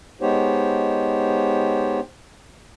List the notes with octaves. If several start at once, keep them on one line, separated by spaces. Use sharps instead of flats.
G#3 B3 D#4 G4 C5 C#5